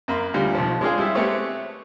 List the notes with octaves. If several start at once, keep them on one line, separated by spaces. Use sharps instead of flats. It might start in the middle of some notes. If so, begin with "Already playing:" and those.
F#2 A#3 B5 C6
D2 G3 F4
B1 F3
G#3 D4 F4 G#4
G3 G#3 E4 G4 E5
G#3 A3 B3 C4 G4 C#5